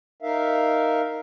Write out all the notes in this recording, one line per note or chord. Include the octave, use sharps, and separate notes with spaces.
D#4 A#4 E5 F5